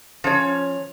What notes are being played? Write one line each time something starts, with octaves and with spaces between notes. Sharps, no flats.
F3 C#4 C#5